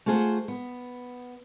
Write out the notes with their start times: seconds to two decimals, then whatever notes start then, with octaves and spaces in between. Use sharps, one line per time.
0.06 A3 F4 G#4 A4 C5 F#5
0.48 B3